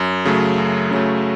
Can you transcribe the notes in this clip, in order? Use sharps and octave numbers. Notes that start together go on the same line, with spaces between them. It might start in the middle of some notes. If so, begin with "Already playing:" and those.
Already playing: F#2
C#3 F#3 A3
F#2
C#3 F#3 A3